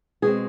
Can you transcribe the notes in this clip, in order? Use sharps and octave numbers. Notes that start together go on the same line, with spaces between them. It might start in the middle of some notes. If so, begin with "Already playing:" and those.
B2 G#3 C4 G#4